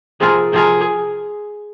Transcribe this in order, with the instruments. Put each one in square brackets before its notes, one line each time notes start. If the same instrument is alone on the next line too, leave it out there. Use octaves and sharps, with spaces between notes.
[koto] C3 F3 C4 F4 A#4 [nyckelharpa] G#4
[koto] C3 F3 C4 F4 A#4 [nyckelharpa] G#4